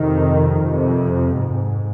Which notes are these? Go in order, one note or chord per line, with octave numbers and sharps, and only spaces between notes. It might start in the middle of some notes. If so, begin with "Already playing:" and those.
Already playing: F2 C3 D#3
F2 C3
G#2